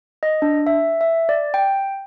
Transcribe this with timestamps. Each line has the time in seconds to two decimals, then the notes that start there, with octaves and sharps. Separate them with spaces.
0.23 D#5
0.42 D4
0.67 E5
1.01 E5
1.29 D5
1.54 G5